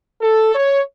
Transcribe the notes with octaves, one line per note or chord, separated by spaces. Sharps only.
A4
C#5